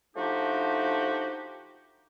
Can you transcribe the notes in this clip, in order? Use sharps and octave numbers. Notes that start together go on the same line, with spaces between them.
F3 A3 D4 D#4 F#4 G4